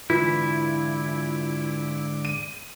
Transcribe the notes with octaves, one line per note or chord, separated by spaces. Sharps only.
G#2 D3 E3 E4 F4 D6 B6
D#7